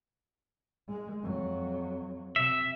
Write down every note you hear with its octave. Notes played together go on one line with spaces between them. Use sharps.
G#3
F2 F#3
C3 E5